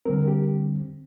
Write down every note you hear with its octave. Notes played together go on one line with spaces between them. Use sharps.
D3 G3 C4 A#4
G4